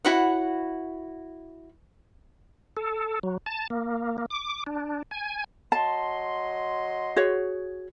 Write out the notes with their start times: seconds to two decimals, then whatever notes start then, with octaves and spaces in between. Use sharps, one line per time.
0.05 E4 F#4 C#5 F#5
2.77 A4
3.23 F#3
3.46 A5
3.70 A#3
4.18 A#3
4.30 D6
4.67 D4
5.11 G#5
5.72 F#3 D#5 A5 C6
7.16 F#4 G#4 C#5